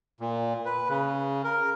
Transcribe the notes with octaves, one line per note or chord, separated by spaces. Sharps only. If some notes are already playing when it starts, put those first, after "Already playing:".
A#2
B4
C#3
A#4